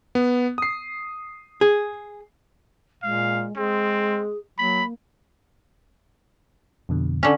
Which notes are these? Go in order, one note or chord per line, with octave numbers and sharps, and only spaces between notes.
B3
D#6 C7
G#4
A#2 G#3 F5
G#3 C4 G#4
F#3 A#3 B5
F2 B2 D3
D3 C#4